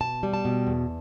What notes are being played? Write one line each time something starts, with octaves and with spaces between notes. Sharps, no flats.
B2 A5
G3
A5
B2
E2